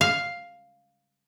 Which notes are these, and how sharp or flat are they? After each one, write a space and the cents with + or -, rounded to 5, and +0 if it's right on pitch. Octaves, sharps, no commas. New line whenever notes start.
F5 +5